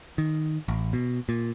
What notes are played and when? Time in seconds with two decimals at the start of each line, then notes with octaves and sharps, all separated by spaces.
0.18 D#3
0.68 A1
0.93 B2
1.29 A#2